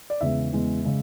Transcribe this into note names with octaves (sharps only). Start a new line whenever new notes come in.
D5
E2 C#3 G#3 E5
E2 C#3 G#3
C#3 G#3